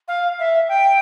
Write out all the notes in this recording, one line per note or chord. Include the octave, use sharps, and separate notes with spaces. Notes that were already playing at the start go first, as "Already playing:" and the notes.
F5
E5
G5